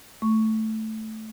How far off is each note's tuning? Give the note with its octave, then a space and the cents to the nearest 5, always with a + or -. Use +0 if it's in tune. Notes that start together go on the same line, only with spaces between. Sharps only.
A3 +0 C#6 +0